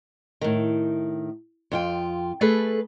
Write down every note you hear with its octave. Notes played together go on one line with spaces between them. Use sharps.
A2 D#3
F2 F4 G5
A3 G#4 A4 B4